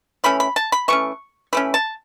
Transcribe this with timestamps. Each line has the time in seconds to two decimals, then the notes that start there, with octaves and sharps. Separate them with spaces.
0.24 E3 A3 C#4 B5
0.40 B5
0.56 A5
0.72 B5
0.88 E3 A3 C#4 C#6
1.53 E3 A3 C#4 B5
1.74 A5